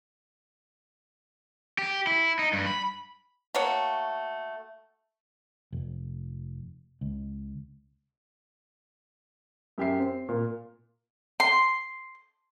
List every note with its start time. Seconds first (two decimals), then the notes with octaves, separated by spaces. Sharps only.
1.78 G4
2.07 E4
2.39 D#4
2.53 G2
2.66 B5
3.55 A3 A#3 F#4 C#5
5.73 F1
7.01 C#2
9.78 F#2 G4 E5 C7
10.00 C4
10.29 A#2
11.40 C6